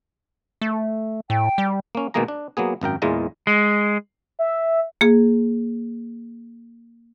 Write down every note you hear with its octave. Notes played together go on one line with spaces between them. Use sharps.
A3
A2 G5
G3
A#3 C#4
B2 D#3 G#3 A#3 G#4 A#5
D4
F#3 A#3 B3 G#4
G#1 F#2 A#4 G5
E2 A#2 E3 G#3 F4 A#5
G#3
E5
A#3 G#4